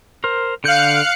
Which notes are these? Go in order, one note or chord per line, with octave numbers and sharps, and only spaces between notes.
A#4 C5
D3 A4 F5 F#6 G6 C#7